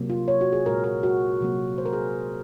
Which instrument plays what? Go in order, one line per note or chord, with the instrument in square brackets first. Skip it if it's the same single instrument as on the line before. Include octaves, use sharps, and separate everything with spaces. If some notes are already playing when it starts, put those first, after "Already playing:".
Already playing: [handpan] C3 F#3 A#3
F4
C#5
F#4
G#4
A#2 G#3 A#4
A#4
F#4
C3 F#3 A#3
C5
A#4
G#4